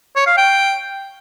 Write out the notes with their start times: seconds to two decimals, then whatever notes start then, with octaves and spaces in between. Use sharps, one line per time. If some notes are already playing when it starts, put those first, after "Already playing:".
0.16 C#5
0.26 F5
0.37 G5